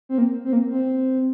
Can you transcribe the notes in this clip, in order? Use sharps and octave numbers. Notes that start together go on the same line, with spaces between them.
C4
A#3
C4
A#3
C4